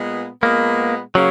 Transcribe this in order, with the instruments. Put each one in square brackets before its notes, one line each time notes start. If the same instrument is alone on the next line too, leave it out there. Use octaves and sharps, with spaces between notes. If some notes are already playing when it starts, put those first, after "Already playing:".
Already playing: [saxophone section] A#2 G#3 B3
[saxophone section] A#2 G#3 B3 [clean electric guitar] A#3
[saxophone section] C#3 A#3 C#4 [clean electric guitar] F#3